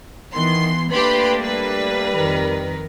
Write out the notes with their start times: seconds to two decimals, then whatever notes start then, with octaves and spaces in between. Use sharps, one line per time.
0.34 D#3 E3 B3 C6
0.91 A3 A#3 D4 G4 B4 B5 C6
1.43 G3 B4
2.14 F2 D#3 A#4